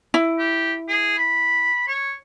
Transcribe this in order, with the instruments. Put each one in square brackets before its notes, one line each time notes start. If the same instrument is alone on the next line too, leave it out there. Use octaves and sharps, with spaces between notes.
[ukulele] E4
[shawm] G4
G#4
B5
C#5